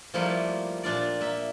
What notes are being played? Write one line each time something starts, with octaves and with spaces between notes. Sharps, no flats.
F3 G3 A3 A#3 E4 F4
A#2 D4 F4 D5
A#3 E5